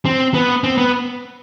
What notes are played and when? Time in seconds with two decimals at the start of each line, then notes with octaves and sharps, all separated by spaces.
0.05 C4
0.34 B3
0.64 C4
0.78 B3